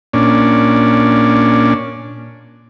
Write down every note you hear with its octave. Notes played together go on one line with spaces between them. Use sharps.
A#2 C#4 D4